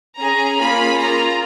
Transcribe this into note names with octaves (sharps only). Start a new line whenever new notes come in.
C#4 G#4 A#5
A#3 C#4 F4 G#4 B5
A#3 F4 G#4 A#5